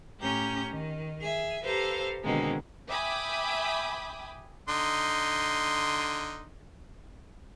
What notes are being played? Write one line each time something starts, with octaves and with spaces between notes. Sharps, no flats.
A2 C#4 G4 A#5 G6
D#3
G#4 E5
G4 A4 B4 C5 F5 A#5
B2 D3 D#3 G#3 A#3 C4
E5 G5 G#5 B5 D6 D#6
D3 D#4 C6